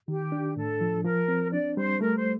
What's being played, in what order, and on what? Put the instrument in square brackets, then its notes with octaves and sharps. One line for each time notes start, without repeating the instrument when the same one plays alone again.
[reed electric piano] D#3 [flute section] G4
[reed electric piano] D4
[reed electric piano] A2 [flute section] A4
[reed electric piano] F3
[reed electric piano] F3 [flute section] A#4
[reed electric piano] C4
[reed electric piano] D4 [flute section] D5
[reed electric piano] G3 [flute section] C5
[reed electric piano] A3 [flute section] A#4
[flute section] C5